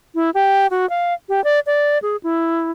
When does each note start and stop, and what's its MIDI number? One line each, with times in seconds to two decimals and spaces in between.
0.15 0.30 64
0.34 0.67 67
0.71 0.89 66
0.90 1.14 77
1.29 1.43 67
1.44 1.60 74
1.66 1.98 74
2.02 2.17 68
2.23 2.71 64